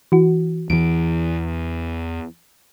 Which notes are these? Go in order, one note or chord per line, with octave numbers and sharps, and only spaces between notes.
E3 F#4
E2 E3 D7